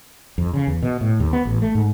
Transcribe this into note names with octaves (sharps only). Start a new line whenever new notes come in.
F2
C#3
E2
B2
A2
D#2
B3
A1
A3
G#2